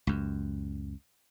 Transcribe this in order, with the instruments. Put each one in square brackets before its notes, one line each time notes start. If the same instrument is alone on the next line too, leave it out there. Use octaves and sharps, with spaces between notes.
[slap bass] C#2 F#2